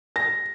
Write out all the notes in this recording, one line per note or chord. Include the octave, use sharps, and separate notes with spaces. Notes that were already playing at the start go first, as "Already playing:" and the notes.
A#6